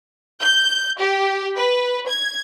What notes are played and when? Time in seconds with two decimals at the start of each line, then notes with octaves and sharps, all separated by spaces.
0.42 G6
0.98 G4
1.56 B4
2.09 G#6